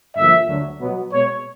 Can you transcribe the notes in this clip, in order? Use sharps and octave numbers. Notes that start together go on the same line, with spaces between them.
G2 D3 F3 A#3 E5
D2 D3 F#3
B2 F#3 B3
B2 G#3 B3 C#5